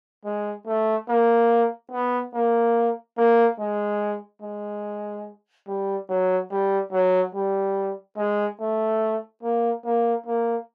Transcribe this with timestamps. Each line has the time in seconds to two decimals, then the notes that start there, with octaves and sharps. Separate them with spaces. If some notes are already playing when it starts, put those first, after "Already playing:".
0.25 G#3
0.67 A3
1.09 A#3
1.92 B3
2.33 A#3
3.17 A#3
3.59 G#3
4.42 G#3
5.67 G3
6.09 F#3
6.51 G3
6.92 F#3
7.35 G3
8.17 G#3
8.60 A3
9.43 A#3
9.85 A#3
10.27 A#3